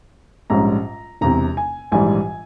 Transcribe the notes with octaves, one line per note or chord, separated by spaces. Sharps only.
A#1 G#2 G3 C#4 A#5
E1 E2 C3 A#5
G#5
A#1 G#2 E3 G3 G#5